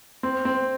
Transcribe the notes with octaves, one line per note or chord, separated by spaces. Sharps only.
C4
C4